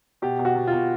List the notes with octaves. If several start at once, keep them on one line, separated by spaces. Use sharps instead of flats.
B2 G4
B2
F#4
B2
B2 F4